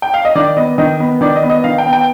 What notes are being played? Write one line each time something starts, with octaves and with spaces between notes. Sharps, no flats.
G5
F5
D#5
D#3 D5
B3 D#5
D#3 D#5
B3
D#3 D5
D#5
B3
D#5
D#3 F5
G5
B3
G5